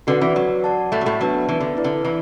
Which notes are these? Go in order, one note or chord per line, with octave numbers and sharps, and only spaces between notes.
D3 F#4 B4 D5 F#5
E3
F#3
F#4 D5 F#5 A5
A2 A3
F#3
A2 A3
F#3 B3 D4 B4 E5 A5
E3
D3
E4 B4 D5
D3
E3